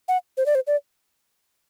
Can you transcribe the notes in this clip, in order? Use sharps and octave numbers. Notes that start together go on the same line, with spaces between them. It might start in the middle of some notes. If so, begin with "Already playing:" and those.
F#5
C5
D5
C5
D5